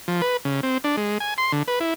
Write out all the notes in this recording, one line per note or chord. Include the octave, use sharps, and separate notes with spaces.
F3
B4
C#3
C4
D4
G#3
G#5
C6
D3
B4
E4